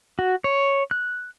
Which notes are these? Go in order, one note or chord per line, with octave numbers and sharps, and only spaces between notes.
F#4
C#5
F#6